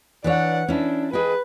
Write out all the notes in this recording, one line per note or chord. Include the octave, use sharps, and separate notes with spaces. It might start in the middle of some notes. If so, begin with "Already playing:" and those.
E3 D4 C#5 D5 F#5
C#4 D4 E4
G#4 B4 D#5 G5